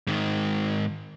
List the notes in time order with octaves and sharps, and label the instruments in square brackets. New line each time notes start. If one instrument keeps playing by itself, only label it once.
[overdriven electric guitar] G#2 D#3